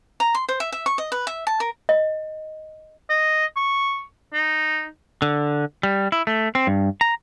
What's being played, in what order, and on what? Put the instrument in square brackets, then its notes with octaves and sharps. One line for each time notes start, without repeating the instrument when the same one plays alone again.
[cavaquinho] A#5
C6
C5
E5
E5
C#6
D#5
B4
E5
A5
A#4
[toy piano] D#5
[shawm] D#5
C#6
D#4
[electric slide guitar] D3
G3
E4
A3
C4
G2
A#5